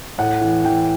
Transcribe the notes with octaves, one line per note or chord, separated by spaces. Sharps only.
A2 F#5
E3
E3 G5